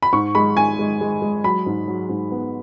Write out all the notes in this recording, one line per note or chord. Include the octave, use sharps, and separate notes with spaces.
B5
G#2 C#6
G#3 B5
G#2 G#5
G#3
G#3
G#3
F#3 B5
G#2
F#3
G#2
B3